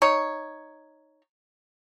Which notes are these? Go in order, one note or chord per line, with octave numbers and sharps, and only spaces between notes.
D#4 C#5